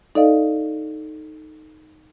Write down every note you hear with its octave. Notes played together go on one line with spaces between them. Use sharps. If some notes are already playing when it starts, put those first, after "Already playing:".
D#4 A4 D5 D#5 F5